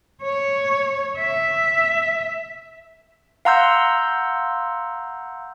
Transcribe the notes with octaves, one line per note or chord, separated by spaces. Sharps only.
C#5
E5
F5 F#5 A#5 C6 E6 G6